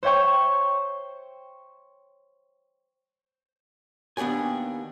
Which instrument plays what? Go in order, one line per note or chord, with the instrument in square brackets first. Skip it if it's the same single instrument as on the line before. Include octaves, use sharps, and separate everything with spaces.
[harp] C5 C#5 E5 G5 C#6
[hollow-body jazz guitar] D#2 B3 D4 G4 G#5